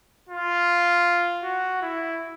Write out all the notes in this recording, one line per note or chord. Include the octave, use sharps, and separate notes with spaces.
F4
F#4
E4